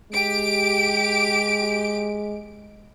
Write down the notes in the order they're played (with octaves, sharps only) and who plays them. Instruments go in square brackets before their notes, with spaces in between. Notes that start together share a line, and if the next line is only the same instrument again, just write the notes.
[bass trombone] G#3 [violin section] G4 D7